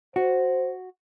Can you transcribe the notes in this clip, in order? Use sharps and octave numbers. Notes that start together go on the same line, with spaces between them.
F#4 C5